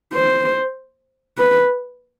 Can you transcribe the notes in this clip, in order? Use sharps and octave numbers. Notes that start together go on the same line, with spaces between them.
C5
B4